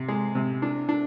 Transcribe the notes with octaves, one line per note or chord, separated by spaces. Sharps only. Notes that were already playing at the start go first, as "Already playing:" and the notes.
Already playing: C3
G#3
C3
D4
D4